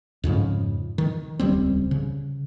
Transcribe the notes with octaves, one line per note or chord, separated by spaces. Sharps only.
F2 G#2 C#3 F3
D#3
D#1 C#2 G3 C4
C#3